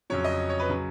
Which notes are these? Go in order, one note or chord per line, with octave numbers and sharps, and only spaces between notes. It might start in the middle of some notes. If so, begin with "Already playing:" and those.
F2 C#3 F#3 C#5
D#5
C#5
B4
C#3 F#3